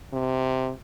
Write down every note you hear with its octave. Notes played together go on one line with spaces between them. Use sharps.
C3